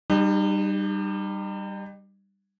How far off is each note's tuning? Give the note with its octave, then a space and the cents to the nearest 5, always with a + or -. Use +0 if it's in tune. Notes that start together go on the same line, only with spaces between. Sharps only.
G3 +0 D#4 -40 G#4 -45